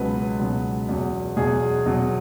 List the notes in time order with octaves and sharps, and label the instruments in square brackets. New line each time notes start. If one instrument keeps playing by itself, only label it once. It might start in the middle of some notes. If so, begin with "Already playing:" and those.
Already playing: [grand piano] C#2 B2 F#3 B4
C#2 B2 F#3
E2 B2 F#3
E2 B2 F#3 G#4
E2 B2 F#3